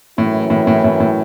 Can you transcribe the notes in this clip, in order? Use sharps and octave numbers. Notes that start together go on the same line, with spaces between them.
F#2 A2 E3 C#4 E4
A2
A2
A2
A2